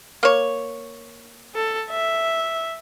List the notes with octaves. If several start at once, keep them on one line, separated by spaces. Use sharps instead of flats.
A#3 C#5
A4
E5